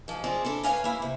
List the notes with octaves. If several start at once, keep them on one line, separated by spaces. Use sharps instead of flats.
G#2 F3
G#3 C4 F4 G#4 D5
D4 E4 A4
B4 C#5 D#5 F5 G#5
A#3 E4
C3